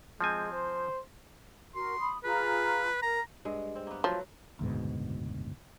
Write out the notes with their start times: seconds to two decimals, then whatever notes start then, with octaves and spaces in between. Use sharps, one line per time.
0.21 F3 G#3 C4 G#5
0.52 C5
1.75 F#4 A#4 C6
2.00 B5 D#6
2.24 F4 G#4 B4 A#5
3.02 A#4 A#5
3.45 G2 G#3
3.75 C4
3.87 A#3 B3
4.04 F3 F#3 A3 B3
4.59 F#1 D2 G#2 B2